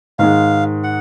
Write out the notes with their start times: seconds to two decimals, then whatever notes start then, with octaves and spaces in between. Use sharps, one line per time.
0.19 G#2 D#3 G#3 F5
0.84 F#5